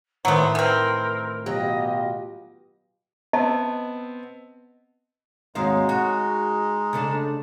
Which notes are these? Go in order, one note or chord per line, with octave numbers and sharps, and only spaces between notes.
A2 D#3 F#3 A3 B3 C5
E3 C4 A#4
B2 F#3 F4 G4 D#5
B3 C4 D#5 A5
D#2 G#2 G#3 C4 D#4 F#4 C#5 F5
F#4 G#4
C#3 A3 D4